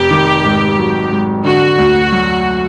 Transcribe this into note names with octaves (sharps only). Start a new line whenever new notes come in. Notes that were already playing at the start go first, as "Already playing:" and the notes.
Already playing: F1 G4
D#3
G#2
F#3
G#2
D3 F#4
D2
F#3